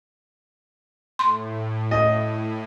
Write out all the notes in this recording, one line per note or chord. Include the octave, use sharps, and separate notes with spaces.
A2 C6
D#5